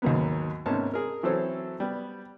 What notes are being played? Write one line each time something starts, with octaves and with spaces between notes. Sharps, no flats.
D#2 G#2 F#3 A#3 B3
G#2 C3 A#3 B3 C#4 A5
G#4 A#4
E3 F#3 C4 A4 C5 C#5
G3 B3